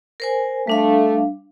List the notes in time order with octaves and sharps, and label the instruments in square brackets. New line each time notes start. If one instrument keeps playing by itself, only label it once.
[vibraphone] A#4 C5 G#5
[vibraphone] G3 D4 F5 [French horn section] A3